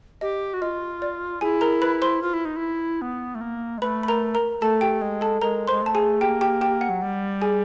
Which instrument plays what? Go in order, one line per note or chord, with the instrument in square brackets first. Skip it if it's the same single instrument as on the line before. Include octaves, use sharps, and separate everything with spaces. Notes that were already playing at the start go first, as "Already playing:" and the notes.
[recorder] G4 [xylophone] D#5
[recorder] F#4
[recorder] F4 [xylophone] D#5
[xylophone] D5
[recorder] E4 [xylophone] G#4 G#5
[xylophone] A#4 A#5
B4 B5
C5 C6
[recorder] F4
E4
D#4
E4
B3
A3
A#3
G#3
[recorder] A3 [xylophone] B4 B5
[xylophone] B5
A#4 A#5
A#4 A#5
[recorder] A3 [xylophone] A4 A5
[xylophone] G4 G5
[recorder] G#3
[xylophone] A4 A5
[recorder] G#3 [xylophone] A#4 A#5
[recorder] G#3 [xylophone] C5 C6
[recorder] A3 [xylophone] A5
[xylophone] G#4 G#5
[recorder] A#3 [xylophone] G4 G5
[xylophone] G4 G5
G4 G5
F#5
[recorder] F#3
G3
[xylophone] G#4 G#5